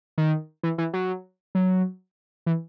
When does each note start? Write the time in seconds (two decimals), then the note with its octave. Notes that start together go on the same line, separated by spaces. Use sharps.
0.18 D#3
0.63 E3
0.78 E3
0.93 F#3
1.55 F#3
2.46 E3